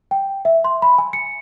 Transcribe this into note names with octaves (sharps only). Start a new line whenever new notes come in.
G5
E5
C6
B5
G#5
C#7